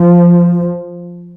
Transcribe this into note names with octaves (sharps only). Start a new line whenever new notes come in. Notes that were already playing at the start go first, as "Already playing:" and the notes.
Already playing: F3